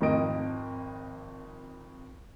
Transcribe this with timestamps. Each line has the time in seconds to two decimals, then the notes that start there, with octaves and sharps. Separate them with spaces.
0.01 G#1 F2 D#3 A#4 D#5 D7